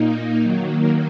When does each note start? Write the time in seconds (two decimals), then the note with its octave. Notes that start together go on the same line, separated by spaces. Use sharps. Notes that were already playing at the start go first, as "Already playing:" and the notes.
Already playing: A#2 A#3 D#4
0.42 D#3 F#3 A#3